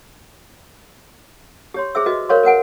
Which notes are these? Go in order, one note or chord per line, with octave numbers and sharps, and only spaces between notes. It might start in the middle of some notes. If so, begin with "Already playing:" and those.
G4 C#5 C6
G#4 C5 E5 E6
F#4 B4 D#5
A#4 C5 C#5 F5 C6 C#6
A#4 B4 F#5 G#5